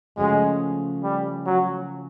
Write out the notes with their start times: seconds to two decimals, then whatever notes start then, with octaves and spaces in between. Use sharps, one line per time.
0.17 C#3 F3 G#3 A3 C#4 F#4
1.03 G3
1.46 F#3